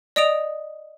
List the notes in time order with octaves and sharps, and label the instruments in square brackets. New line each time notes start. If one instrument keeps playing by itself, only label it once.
[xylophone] D5 D#5 D#6 D7 F7